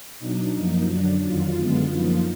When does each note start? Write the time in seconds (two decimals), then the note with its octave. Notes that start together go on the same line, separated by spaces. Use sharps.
0.20 B2 F#3 D4 D#4
0.54 F#2 F3 A#3 D#4
0.88 F#2 D3 F#3 D4
1.22 F2 D#3 F#3 F4
1.56 F#2 D3 G#3 B3
1.91 F#2 F3 A#3 D#4